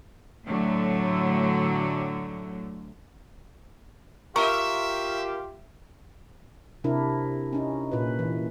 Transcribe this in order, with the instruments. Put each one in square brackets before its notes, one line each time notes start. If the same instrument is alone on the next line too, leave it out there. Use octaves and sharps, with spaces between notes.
[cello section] A2 D3 F#3 A3
[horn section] F4 G4 [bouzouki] A#4 [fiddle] E5 [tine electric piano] C#6
[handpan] C3 D4 E4 A#4
C#4 D#4
A#2 B4
E3